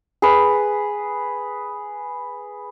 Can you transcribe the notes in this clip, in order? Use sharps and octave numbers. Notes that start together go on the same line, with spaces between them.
G#4 B4